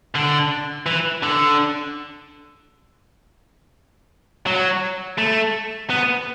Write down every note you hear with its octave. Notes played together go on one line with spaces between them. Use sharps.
D3
E3
D3
F#3
A3
B3